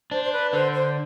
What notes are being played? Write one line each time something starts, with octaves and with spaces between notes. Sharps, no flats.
D4 C5
C5
B4
D3 C5
C5